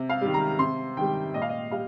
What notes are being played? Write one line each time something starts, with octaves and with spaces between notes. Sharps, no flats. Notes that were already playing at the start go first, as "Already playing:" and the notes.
Already playing: C3
F5
D#3 G3
A#5
C3 C6
D#3 G3 G5
A#2 D#5
F5
D#5
G3 F5